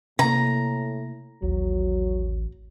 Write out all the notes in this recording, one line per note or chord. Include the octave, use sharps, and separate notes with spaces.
A2 C3 A#3 A#5
A1 D#2 F#3